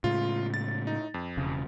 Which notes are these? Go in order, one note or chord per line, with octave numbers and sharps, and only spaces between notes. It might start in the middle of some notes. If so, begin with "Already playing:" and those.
A2 C#3 G#3 F4
A6
D#4
F2
E1 C#3